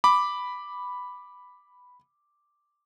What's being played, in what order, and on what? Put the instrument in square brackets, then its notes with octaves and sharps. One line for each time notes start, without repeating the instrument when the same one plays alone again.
[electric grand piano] B5 D6